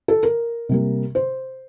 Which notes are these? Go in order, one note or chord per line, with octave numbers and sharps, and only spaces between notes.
A4
A#4
C3 G3 A#3
C5